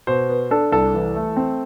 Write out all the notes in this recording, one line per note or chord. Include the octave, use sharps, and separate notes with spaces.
B2 C5
B3
D4 A4
C2 A4
E3
A3
C4